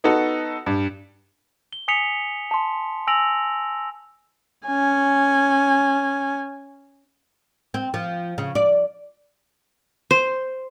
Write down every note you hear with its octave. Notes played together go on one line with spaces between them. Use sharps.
B3 D#4 F#4 A4
G2
G7
G#5 D#6 B6 C#7 F7 G7
A5 C6
G#5 E6 A#6 D7 F7 F#7
C#4 G#5
C4
F3
C#3
D5
C5